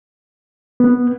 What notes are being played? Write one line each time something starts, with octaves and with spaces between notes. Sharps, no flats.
B3